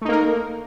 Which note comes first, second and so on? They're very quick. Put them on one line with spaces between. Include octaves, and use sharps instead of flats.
A3 D#4 A#3 A#4